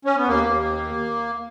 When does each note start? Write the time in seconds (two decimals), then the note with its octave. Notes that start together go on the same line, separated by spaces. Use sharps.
0.05 C#4
0.16 B3
0.27 D#2 A#3
0.46 D#2